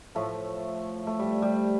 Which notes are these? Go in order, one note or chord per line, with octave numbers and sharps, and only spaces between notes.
A2 F3 A3
A3
G3
G3